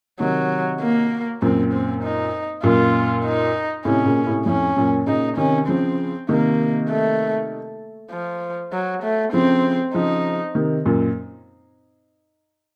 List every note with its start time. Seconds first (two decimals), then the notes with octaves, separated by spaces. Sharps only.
0.20 C3 D#3 F#3
0.81 A#3
1.42 F#2 A#2 C4
1.73 C4
2.03 D#4
2.63 F#2 A#2 F4
3.25 D#4
3.85 A2 C3 C#4
4.05 A#2 C#3
4.26 A2 C3
4.46 F2 A2 C#4
4.77 F#2 A#2
5.07 A#2 C#3 D#4
5.37 C3 D#3 C#4
5.68 C#3 F3 C4
6.29 C3 D#3 A#3
6.90 A3
8.11 F3
8.73 F#3
9.03 A3
9.33 C#3 F3 C4
9.94 C#3 F3 D#4
10.55 C3 D#3
10.86 F#2 A#2